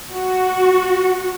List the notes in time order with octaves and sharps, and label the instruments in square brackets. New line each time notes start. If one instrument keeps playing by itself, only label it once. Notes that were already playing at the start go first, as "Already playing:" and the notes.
[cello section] F#4